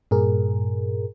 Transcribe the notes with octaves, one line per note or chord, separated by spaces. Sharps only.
G2 A#2 G#4 A#4